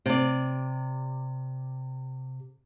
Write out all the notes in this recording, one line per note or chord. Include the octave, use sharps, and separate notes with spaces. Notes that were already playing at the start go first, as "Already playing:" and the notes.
C3 D5